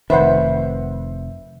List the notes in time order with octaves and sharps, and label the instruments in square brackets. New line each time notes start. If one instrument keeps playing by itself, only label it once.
[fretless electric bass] F1 D#3 [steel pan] B4 C5 F#5 [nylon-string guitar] E5